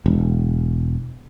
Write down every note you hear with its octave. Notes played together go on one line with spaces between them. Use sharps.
E1